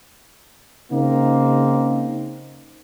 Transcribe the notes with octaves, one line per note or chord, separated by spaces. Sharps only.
C#3 A#3 C4 D#4